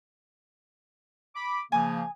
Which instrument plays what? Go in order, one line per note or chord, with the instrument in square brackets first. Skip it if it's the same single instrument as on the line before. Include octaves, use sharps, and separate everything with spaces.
[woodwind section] B5 D6
[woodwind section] C#3 F3 A#3 [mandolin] G#5 D#6